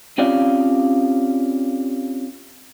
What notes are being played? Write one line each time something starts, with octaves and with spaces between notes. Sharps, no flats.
C4 C#4 F4 G4 D5 F5